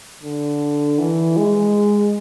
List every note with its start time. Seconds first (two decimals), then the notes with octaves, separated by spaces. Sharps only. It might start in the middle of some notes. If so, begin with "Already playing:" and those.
0.23 D3
0.99 E3
1.37 G#3